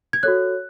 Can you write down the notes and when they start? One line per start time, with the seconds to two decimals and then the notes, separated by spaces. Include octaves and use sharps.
0.13 G#6
0.23 F#4 A4 C#5 F#6